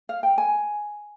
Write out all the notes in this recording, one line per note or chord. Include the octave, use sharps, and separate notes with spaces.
F5
G5
G#5